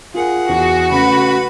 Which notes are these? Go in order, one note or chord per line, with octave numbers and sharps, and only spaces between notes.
F4 G#4 A#4 F#5
E2 F#4
C#3 A3 B4 B5